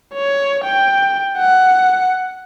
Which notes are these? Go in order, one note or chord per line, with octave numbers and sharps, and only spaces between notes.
C#5
G5
F#5